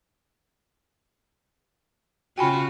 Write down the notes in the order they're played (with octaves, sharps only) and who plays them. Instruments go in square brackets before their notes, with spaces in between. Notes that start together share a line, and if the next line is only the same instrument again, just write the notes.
[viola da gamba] C#3 F4 F#4 [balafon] G5 G#5 B5